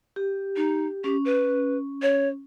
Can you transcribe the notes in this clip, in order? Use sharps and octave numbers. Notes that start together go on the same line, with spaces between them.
G4
D#4
C#4 G4
B4
C#5